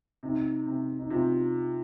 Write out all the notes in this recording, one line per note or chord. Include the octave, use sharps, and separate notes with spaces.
C3 D#4
C3
D#4
C3 F4